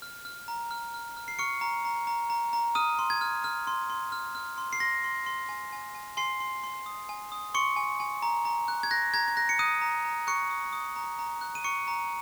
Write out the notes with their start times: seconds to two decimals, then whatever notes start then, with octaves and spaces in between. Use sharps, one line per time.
0.02 F6
0.25 F6
0.48 A#5
0.71 F6
0.94 F6
1.17 F6
1.28 C7
1.39 C#6 F6 C#7
1.61 A#5
1.85 A#5
2.07 A#5
2.30 A#5
2.53 A#5
2.75 D#6 F6 D#7
2.99 C6
3.10 G#6
3.21 F6
3.44 F6
3.67 C6
3.90 C6
4.12 F6
4.35 F6
4.58 C6
4.73 C7
4.80 C6 A#6
5.04 C6
5.26 C6
5.49 G#5
5.73 G#5
5.95 G#5
6.17 G#5 C6 C7
6.40 C6
6.64 C6
6.86 D#6
7.09 G#5
7.32 D#6
7.54 C6 C#6 C#7
7.76 G#5
8.00 G#5
8.22 A#5
8.45 A#5
8.68 F#6
8.83 G#6
8.91 F#6 A#6
9.14 A#5 G#6
9.28 G#6
9.37 F#6 A#6
9.49 C#7
9.59 D#6 F#6 D#7
9.82 A#5
10.05 A#5
10.27 C#6 F#6 C#7
10.50 D#6
10.73 D#6
10.96 A#5
11.19 A#5
11.41 F#6
11.55 D#7
11.64 C#6 C#7
11.88 A#5